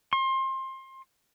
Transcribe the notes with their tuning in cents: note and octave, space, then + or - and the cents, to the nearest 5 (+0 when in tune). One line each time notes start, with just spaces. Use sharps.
C6 +25